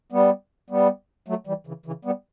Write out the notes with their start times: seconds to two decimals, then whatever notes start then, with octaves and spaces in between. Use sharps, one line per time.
0.12 G3 B3
0.70 G3 B3
1.28 F#3 A3
1.47 E3 G3
1.67 C#3 E3
1.86 C#3 E3
2.05 G3 B3